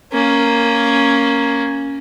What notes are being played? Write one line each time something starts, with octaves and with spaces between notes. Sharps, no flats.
A#3 C#4